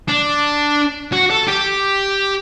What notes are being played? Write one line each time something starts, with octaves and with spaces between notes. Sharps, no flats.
D4
F#4
A4
G4